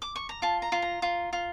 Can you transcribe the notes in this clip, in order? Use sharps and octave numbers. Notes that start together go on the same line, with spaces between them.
D6
C#6
A#5
F4 A5
A#5
F4
A#5
F4
F4